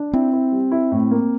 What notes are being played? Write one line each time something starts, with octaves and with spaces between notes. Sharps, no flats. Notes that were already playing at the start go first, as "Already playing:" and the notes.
Already playing: D4
C4 E4
E4
G3
E4
A2
A#3